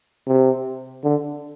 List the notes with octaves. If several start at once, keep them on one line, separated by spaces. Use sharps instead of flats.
C3
D3